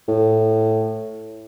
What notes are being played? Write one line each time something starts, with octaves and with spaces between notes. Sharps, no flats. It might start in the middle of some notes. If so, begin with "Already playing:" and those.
A2